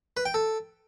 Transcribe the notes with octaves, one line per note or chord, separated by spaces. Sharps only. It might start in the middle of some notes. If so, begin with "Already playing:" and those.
B4
G5
A4